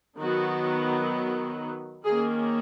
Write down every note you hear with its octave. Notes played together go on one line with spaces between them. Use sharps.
D#3 F#3 B3 F#4
D#3 A#3 C#4 G#4